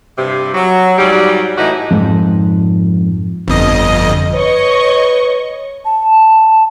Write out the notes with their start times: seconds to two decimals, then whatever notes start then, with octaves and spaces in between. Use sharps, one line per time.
0.17 G2 C3
0.54 F#3
0.98 G#2 F#3 G3
1.58 A2 E3 D#4 F#4 G4
1.91 F2 G#2
3.48 G1 F2 D#5
4.34 B4 C#5 D#5 C#6
5.85 A5